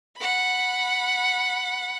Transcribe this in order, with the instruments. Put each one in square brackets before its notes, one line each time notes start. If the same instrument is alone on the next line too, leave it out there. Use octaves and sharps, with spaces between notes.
[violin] F#5 B5